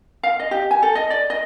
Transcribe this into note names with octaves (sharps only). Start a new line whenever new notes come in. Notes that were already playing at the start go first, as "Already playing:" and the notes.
F5
D#5
G4
G#5
A4
D#5
D5
D#5